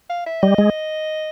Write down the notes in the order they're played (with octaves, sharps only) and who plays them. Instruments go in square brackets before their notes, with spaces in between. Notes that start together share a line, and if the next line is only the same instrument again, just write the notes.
[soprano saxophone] F5
E5
[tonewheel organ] G3 [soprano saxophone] D#5
[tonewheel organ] G#3